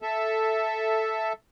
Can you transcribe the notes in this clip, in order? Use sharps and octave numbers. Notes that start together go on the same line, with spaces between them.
A4 E5